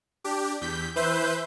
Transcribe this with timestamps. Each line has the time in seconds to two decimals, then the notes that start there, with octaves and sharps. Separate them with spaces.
0.24 D4 G4
0.61 E2 G6 B6
0.96 E3 B4 C5 E5 G6